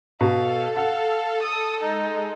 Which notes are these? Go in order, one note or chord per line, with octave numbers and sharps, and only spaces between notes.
B2 A4 F5
F5 F#5
D#6
G#3 D#4